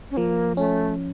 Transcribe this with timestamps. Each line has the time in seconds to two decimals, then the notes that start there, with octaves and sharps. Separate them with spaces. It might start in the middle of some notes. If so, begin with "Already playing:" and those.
0.11 C#4
0.17 F3 A#3
0.57 A3 C#4